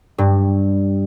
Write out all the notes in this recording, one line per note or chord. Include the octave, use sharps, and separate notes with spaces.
G2